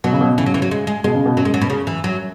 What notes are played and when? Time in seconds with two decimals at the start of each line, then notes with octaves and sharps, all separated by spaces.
0.04 B2 F#3
0.12 C#3
0.21 B2
0.38 C#3 E3
0.46 F#3
0.54 E3
0.62 F#3
0.71 G#3
0.87 G#3
1.04 B2 G#3
1.15 C#3
1.26 B2
1.37 F#2 F#3
1.45 G#3
1.54 F#3
1.61 B2
1.70 C#3
1.87 E3
2.04 F#3